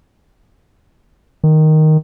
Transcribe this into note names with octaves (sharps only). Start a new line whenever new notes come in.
D#3